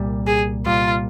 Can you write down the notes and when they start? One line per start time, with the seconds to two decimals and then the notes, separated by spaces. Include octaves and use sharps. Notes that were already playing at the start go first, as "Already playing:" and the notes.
Already playing: C2 A#2 G3
0.27 G#4
0.66 C2 A#2 G3 F4